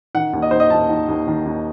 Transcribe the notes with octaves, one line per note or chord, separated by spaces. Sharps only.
D#3 F#5
D#2
D#5
D#3 C5
D#5
D#2 A5
D#3
D#2
D#3
D#2